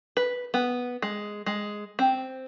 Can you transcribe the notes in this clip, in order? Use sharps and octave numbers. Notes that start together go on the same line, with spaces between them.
B4
B3
G#3
G#3
C4